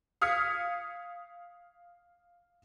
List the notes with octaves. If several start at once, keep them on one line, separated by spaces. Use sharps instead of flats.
F5 D#6 F6 G#6 B6 C#7